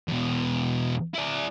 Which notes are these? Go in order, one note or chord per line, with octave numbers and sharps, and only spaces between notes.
E2 B2
E4 D5